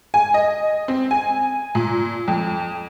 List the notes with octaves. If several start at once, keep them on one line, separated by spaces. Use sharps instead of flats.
G#5
D#5
C4
G#5
A#2
F2